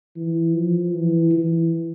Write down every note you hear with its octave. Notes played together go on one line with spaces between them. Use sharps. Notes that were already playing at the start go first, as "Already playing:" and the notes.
E3
F3
E3
E3